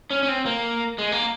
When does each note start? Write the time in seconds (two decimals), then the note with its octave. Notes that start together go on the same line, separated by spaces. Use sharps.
0.10 C#4
0.23 C#4
0.28 C4
0.46 A#3
0.98 G#3
1.12 A#3